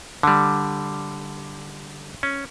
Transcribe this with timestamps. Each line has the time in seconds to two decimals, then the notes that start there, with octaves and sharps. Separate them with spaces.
0.23 D3 G3
2.23 C#4